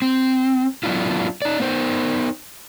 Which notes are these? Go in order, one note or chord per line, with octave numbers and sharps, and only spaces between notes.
C4
F#3 B3 D4 E4 F4
D#4 D5
B3 D#4 C5